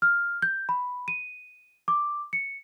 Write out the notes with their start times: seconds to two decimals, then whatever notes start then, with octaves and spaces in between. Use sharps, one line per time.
0.02 F6
0.42 G6
0.69 B5
1.08 D#7
1.88 D6
2.33 C#7